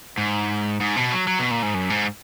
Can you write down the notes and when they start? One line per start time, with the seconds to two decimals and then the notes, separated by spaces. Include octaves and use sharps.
0.18 G#2
0.80 G#2
0.96 B2
1.12 F#3
1.27 F#3
1.39 B2
1.51 A#2
1.63 G#2
1.74 F#2
1.90 G#2